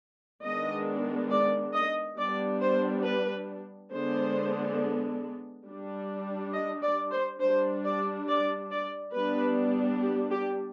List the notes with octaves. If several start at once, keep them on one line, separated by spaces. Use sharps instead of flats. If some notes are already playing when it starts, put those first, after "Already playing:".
D#3 G#3 B3 D4 D#5
D5
D#5
G3 B3 D4 D5
C5
B4
D3 G#3 B3 D4 C5
G3 D4
D#5
D5
C5
G3 D4 C5
D5
D5
D5
G3 B3 D4 B4
G4
G4